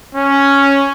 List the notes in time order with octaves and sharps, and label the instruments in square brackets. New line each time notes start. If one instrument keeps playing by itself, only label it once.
[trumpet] C#4